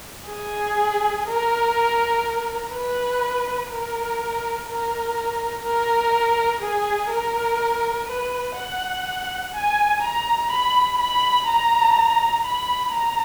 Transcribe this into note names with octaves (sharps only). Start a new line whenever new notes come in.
G#4
A#4
B4
A#4
A#4
A#4
G#4
A#4
B4
F#5
G#5
A#5
B5
B5
A#5
B5
A#5